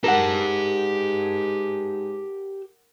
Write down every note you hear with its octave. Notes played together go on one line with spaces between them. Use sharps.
G#2 G4 A#4 F#5 A5